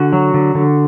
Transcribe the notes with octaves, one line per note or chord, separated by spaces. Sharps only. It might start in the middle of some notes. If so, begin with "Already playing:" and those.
Already playing: D3 F#4
F#3
D3
D3